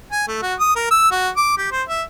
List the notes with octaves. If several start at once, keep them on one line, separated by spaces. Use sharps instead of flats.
G#5
A3
F#4
D#6
A#4
E6
F#4
D6
G4
C5
E5